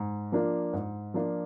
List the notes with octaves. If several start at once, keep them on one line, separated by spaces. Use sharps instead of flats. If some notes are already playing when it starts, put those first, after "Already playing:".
Already playing: G#2
F3 A#3 D4 F4
G#2
F3 A#3 D4 F4